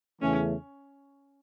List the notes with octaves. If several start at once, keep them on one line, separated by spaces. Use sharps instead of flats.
E2 C#3 E3 A3 C#4